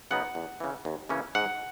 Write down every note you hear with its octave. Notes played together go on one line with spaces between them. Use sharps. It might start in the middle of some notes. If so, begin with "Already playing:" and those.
C#3 F#3 B3 D#4 F#5
E2
C#3 E3
D#2
C#3 E3 A#3 C#4
G#2 F#5